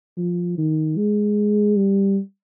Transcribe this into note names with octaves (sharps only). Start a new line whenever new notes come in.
F3
D#3
G#3
G3